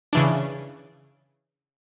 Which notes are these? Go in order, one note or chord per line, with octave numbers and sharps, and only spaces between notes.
C#3 E3 D4